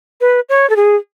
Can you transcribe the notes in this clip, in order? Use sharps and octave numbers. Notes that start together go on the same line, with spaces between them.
B4
C#5
A4
G#4